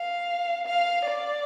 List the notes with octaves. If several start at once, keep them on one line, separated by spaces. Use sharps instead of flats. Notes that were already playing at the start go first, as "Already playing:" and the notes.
Already playing: F5
F5
D5